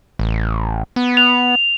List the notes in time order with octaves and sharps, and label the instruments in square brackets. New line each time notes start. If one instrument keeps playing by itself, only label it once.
[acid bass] A1
B3
[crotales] F7